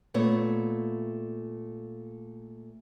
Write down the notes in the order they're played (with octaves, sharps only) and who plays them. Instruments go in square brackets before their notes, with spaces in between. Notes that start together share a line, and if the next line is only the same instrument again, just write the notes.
[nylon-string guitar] A#2 A3 B3 C#5